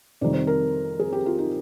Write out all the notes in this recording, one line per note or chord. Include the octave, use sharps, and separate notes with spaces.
F2 C3 D#3 G3 D5
C5
A#4
G#4
G4
F4
D#4